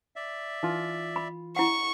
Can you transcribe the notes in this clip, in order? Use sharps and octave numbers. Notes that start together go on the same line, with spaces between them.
D5 E5
E3 D#4 F4
B5
E4 F#5 C#6